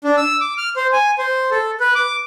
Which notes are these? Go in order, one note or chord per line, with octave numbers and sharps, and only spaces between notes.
D4
E6
D6
F6
C5
G#5
C5
A4
B4
D6